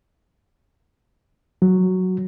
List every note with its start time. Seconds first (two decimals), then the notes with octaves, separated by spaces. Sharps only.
1.62 F#3